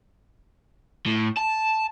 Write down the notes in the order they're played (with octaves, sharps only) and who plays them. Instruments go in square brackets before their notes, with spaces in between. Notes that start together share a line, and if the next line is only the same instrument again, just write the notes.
[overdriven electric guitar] A2
A5